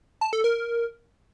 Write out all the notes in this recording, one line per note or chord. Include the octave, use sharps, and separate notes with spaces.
A5
A4
A#4